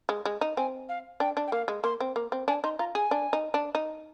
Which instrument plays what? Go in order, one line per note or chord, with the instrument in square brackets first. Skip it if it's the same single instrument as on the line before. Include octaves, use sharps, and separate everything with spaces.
[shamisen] G#3
G#3
D#4
[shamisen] C4 [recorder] G#5
[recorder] F5
[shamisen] D4 [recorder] G5
[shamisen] D4
[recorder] G5
[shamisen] A#3 [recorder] F5
[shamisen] G#3
[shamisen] A#3 [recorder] C6
[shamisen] C4
A#3
C4
[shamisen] D4 [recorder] G#5
[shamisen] D#4 [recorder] C6
[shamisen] F4 [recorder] A#5
[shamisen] G#4 [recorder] G#5
[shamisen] D4
D#4
D4
D#4